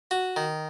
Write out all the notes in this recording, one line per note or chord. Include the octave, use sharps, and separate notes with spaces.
F#4
D#3